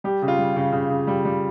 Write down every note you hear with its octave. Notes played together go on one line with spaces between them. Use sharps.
G3 G4
C#3
F4
G3
C#3
C#3
C#3
G3
G3